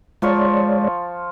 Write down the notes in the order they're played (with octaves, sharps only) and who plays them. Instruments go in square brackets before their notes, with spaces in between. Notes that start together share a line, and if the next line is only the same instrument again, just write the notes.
[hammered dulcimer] F3 F4 C#6 [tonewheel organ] G#3 C#5 D5